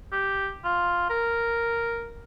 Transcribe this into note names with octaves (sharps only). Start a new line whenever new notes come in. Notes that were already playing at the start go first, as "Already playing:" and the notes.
G4
F4
A#4